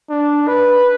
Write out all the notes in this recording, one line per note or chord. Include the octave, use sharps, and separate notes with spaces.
D4
B4